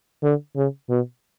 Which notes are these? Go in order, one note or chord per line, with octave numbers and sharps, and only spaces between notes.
D3
C#3
B2